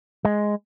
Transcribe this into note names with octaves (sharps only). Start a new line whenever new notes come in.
G#3